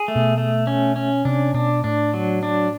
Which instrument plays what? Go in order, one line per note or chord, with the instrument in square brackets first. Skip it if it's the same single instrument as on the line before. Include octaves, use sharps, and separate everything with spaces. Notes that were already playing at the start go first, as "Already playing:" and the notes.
Already playing: [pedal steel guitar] G#4
A3
[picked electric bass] B2
[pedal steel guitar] A3
C#4
C#4
[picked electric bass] C3 [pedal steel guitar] D4
[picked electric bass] B2 [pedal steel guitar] D4
[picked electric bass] A2 [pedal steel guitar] D4
[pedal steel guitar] F#3
D4